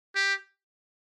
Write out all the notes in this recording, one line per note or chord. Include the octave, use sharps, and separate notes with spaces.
G4